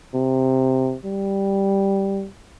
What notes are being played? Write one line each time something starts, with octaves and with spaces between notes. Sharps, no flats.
C3
G3